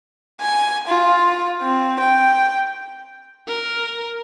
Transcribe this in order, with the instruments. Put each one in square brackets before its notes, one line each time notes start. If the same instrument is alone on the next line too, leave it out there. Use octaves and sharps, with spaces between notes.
[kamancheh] G#5
F4
C4
G5
[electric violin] A#4